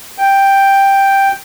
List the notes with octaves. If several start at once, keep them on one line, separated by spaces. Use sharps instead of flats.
G5